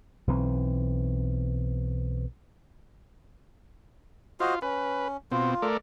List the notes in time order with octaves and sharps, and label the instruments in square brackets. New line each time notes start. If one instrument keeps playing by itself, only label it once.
[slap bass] B1 E3 C4
[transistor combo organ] F4 [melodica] F#4 C5 D#5
[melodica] C#4 [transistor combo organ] B4
[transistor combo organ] B2 C4 [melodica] F4
[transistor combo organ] A3 A#4 D5